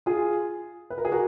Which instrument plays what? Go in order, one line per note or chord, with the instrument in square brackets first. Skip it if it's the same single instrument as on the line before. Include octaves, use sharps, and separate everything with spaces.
[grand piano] F4 G#4
B4
A#4
G#4
F#4 A#4